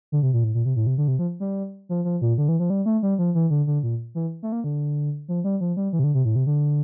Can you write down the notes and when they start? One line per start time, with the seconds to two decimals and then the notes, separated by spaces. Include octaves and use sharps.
0.12 D3
0.23 C3
0.33 A#2
0.44 A2
0.55 A#2
0.65 C3
0.76 A2
0.87 C3
0.98 D3
1.08 C3
1.19 F3
1.40 G3
1.89 F3
2.05 F3
2.22 A#2
2.38 D3
2.49 E3
2.60 F3
2.70 G3
2.86 A3
3.03 G3
3.19 F3
3.35 E3
3.50 D3
3.67 D3
3.83 A#2
4.15 E3
4.43 A3
4.52 A#3
4.64 D3
5.28 F3
5.44 G3
5.61 F3
5.77 G3
5.93 E3
5.99 C3
6.04 D3
6.14 C3
6.25 A2
6.36 C3
6.47 D3